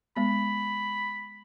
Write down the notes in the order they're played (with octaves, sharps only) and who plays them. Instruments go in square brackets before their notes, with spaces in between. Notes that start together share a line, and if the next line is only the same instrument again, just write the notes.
[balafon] G#3 B3 [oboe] B5